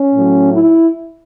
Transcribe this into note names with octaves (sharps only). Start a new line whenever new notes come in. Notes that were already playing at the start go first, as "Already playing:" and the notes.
Already playing: C#4
A2 F#3
E4